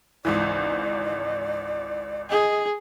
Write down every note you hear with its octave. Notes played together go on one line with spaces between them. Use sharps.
G#1 C#2 E3 D5
G#4 D#5